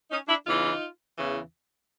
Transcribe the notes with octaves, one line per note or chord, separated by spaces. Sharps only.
C#4 D#4
D4 E4
E2 C#3 E3 D#4 F4
E2 C#3 E3